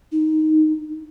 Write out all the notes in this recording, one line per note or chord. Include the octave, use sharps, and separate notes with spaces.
D#4